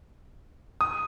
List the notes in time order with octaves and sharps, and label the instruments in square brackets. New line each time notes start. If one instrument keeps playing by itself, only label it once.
[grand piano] D#6